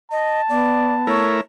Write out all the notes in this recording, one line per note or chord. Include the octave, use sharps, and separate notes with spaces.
D#5 A5
B3 D5
A3 E4 A#4 C#5